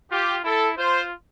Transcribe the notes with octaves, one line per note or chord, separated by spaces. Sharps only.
F4 G4
E4 A4
F4 C5